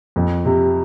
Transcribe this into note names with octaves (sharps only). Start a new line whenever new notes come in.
F2
C3